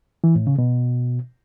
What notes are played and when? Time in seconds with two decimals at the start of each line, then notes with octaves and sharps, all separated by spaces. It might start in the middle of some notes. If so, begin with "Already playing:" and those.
0.24 E3
0.35 A2
0.47 C#3
0.58 B2